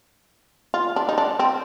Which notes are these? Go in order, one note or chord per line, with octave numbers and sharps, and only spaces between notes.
F4
D4
D#4
D4
C4